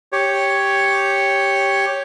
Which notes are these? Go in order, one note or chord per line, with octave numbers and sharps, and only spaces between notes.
G4 C#5